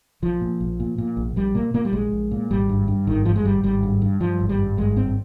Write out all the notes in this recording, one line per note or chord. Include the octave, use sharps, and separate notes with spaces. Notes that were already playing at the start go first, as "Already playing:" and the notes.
A#1 F3
A#2
A#1
A#2
A#2
A#1
A#1 G3
A#2 A#3
A#2 A#3
G3
A#1 G#3
A#1
A#2
G#1 G3
G2
G2
G#1 D#3
G2 F3
G#3
G#1 G3
G#1 G3
G2
G2
G2 F3
G#1
G3
G2
G#1 G#3
G2 C4